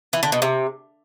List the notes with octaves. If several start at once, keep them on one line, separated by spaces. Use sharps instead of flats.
E3
D3
B2
C3